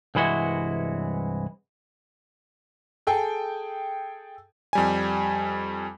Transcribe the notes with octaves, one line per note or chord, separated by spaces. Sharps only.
C2 G2 E3 G#3 E4 F#4
G#4 A4 G5 G#5
F2 G3 G#5